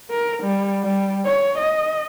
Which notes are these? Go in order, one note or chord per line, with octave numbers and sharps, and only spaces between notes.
A#4
G3
G3
C#5
D#5